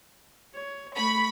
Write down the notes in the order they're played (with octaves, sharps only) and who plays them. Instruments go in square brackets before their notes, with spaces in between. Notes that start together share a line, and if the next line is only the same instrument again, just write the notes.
[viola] C#5
[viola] A3 C#6 [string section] B5